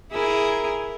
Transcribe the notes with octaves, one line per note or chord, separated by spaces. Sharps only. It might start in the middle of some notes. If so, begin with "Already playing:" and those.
E4 G#4 A#4